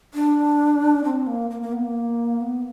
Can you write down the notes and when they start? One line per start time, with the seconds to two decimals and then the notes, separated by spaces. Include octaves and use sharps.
0.14 D4
1.04 C4
1.27 A#3
1.50 A#3
1.62 A#3
1.73 B3
1.84 A#3
2.41 B3